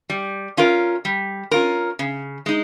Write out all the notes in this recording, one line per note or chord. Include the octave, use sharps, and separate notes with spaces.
G3
C#4 F4 A#4
G3
C#4 F4 A#4
C#3
G#3 D#4